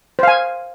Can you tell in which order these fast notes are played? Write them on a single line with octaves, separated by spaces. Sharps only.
C5 F5 G#5